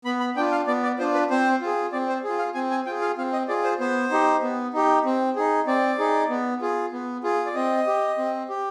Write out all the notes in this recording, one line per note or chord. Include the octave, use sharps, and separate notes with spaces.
B3 B5
B5
D4 F4 G5
F5
B3 D5
D5
D4 F4 C5
B4
C4 C5
F4 G#4
C4 D5
C5
F4 G#4
F5
C4 G#5
G#5
F4 G#4 G5
F5
C4 F5
D#5
F4 G#4 D5
C5
B3 C5
D#4 G4
B3
D#4 G4
C4
D#4 G#4
C4 D5
D#4 G#4
B3
F4 G#4
B3
F4 G#4
D5
C4 D#5
G4
C4
G4